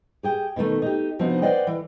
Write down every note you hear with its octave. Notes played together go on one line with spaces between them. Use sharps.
G4 G#4 G5
B2 D3 D#3 A3
D#4 G4
C3 F3 B3 D4 D#4 F#4
B4 C5 D5 D#5 F#5 G5
E3